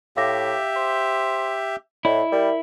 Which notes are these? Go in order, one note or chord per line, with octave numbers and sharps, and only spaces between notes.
A2 G4 E5 F5 D6 A#6
C5
A2 E4 D5 D#5 B5
G3 A#4 D5 E5